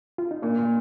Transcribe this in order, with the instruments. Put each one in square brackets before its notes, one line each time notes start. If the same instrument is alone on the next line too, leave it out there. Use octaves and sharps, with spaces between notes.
[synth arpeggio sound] F4
D#4
[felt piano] A#2 [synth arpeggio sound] A#3 D4
[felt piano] A#2